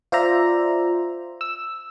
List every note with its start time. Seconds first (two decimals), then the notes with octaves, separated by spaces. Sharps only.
0.12 F4 C5 D5 E5 A#5
1.41 E6